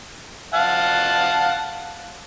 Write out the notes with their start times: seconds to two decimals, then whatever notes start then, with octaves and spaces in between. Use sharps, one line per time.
0.54 F5 F#5 A5